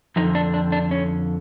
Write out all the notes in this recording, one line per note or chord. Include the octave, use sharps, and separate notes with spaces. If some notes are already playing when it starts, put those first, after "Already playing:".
F2 D3 F3 D#4
D4
D4
D4
C#4